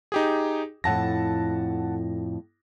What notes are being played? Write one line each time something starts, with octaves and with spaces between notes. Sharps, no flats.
D#4 G4 G#4
F2 A2 F#5 A5 A#6